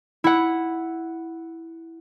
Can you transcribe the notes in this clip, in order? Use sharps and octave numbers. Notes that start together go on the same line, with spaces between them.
E4 F#5